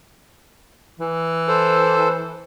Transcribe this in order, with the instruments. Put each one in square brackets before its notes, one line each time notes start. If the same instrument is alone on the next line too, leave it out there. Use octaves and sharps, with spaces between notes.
[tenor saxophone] E3
[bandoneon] A4 C5